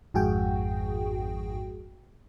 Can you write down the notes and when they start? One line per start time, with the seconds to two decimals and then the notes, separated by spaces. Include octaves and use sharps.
0.14 G#1 F2 G#2 F#4 G#4 G5